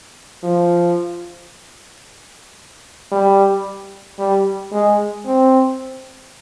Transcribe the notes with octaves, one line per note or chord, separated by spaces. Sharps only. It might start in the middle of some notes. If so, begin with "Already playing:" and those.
F3
G3
G3
G#3
C4